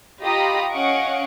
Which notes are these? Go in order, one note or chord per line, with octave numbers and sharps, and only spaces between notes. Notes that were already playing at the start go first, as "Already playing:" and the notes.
F4 G4 D#5 A#5 B5 D#6
C#4 D#5 F5 F#5 C#6 D7